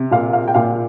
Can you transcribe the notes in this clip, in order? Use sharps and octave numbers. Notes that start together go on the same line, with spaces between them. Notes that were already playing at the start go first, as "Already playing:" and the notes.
Already playing: C3
A#2 F5
F5
G5
A#2 F5